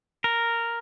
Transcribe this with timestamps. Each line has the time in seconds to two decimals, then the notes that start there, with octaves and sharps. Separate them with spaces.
0.24 A#4